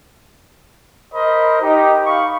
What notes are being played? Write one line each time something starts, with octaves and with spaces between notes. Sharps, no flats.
A#4 C5 D#5 B5
D#4 G4
F5 B5 C#6